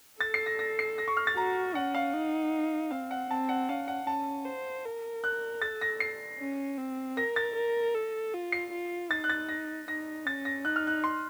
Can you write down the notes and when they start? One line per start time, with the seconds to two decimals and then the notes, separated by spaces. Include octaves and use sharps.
0.21 A4 A6
0.34 C7
0.46 A#6
0.59 A#6
0.79 C7
0.98 A#6
1.08 C#6
1.17 F6
1.27 A6
1.37 F#4 A#5
1.75 C#4 F#5
1.95 F5
2.13 D#4
2.91 C4 F5
3.11 F#5
3.30 C4 A5
3.49 F#5
3.69 C#4 F5
3.88 F#5
4.07 C#4 A5
4.46 C5
4.85 A#4
5.24 F#6
5.62 A4 A6
5.81 A#6
6.00 C7
6.39 C#4
6.78 C4
7.17 A#4 A#6
7.36 A6
7.56 A#4
7.95 A4
8.33 F4
8.52 C7
8.72 F4
9.11 D#4 A6
9.24 F#6
9.30 A6
9.49 A#6
9.88 D#4 A#6
10.26 C#4 A6
10.45 A#6
10.65 D#4 F#6
10.76 F6
10.87 F#6
11.04 C6